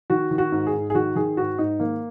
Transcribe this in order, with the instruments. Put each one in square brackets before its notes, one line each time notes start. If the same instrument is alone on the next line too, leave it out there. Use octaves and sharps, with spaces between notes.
[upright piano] D#3 F#4
D#3
F#4
G#2
G#4
G#2
G#4
D#3 F#4
D#3 G#4
G#2 F#4
G#2 D#4
D#3 A#3